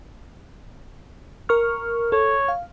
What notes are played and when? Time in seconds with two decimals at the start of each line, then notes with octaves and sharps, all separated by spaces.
1.49 A#4 C#6 F6
2.12 A4 C#5
2.48 F5